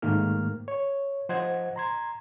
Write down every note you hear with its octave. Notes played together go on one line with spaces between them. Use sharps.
G#2 D#3 A3 A#3 F6
C#5
F3 C5 D#5 F#5 G#6
A#5 C6 G#6